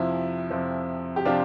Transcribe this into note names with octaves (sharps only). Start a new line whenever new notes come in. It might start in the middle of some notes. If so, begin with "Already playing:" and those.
Already playing: F2 C3 F3 E4
F2 C3 F3
G4
C3 F3 D4 F4